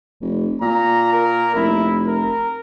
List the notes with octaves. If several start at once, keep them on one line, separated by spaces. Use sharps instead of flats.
F1
A#2 A#5
A#4
F1 E4
A#4